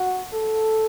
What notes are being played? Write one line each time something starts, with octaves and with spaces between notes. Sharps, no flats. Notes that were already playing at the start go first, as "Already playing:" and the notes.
Already playing: F#4
A4